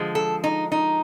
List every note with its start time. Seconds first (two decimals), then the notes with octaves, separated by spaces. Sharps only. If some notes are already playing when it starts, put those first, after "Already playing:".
Already playing: D3 F3 G#3
0.15 A4
0.44 D#4
0.72 D#4